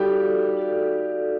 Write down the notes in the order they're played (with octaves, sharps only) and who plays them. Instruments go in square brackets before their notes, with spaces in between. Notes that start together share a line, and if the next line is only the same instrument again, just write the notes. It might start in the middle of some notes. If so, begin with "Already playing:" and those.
Already playing: [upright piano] G3 G4 [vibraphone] D#4 F#4 A4 D5 F5
[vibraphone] D#4 F#4 A4 D5 F5